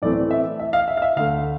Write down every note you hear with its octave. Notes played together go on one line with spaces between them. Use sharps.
A2 E3 A3 C4 D5
E5
E5
F5
E5
F5
E5
D2 D3 A3 F5